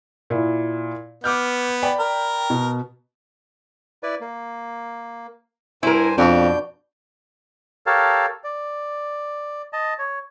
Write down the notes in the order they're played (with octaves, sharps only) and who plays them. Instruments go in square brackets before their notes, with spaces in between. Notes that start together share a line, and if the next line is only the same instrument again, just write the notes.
[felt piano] A#2 E4
[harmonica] B3 [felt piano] D6 F6 G6
[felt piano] D5 G5 B5
[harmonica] A#4
[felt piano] B2
[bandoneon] E4 B4 D5
A#3
[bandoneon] G2 C5 G#5 [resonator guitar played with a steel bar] E4 A#4
[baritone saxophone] F2 [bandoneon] B2 G6 [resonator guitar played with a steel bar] D4
[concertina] G4 A4 A#4 C#5 F5 A5
D5
D#5 A5
C#5